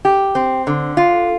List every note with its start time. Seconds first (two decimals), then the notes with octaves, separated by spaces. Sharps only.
0.05 G4
0.35 C4
0.67 D3
0.97 F4